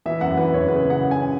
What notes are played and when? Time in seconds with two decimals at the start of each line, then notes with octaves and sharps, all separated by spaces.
0.06 E3 E5
0.21 F#2 F#5
0.37 E3 B4
0.53 F#2 C#5
0.69 C#3 B4
0.85 C#3
0.90 F#5
1.01 C#3
1.11 G#5